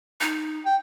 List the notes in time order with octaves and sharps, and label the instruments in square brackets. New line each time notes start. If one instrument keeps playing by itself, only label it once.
[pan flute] D#4
[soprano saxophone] G5